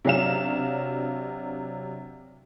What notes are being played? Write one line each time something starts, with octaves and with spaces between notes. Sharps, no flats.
C3 F#3 D4 F5 A#5 E7